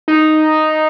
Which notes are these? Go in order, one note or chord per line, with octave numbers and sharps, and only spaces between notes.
D#4